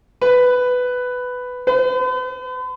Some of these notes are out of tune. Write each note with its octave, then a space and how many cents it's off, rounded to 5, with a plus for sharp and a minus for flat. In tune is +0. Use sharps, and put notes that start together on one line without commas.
B4 +10
B4 +45